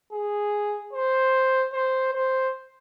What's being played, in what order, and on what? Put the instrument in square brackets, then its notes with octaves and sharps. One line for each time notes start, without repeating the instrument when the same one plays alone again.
[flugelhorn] G#4
C5
C5
C5